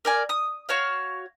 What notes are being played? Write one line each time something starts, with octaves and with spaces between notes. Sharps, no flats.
A#4 D5 G#5
D#6
F#4 C#5 F5